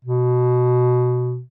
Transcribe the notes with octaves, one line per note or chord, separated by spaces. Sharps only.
B2